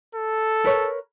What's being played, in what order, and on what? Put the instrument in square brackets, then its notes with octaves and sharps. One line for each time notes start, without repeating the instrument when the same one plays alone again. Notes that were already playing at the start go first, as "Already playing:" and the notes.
[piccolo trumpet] A4
[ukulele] A#4 B4 C#5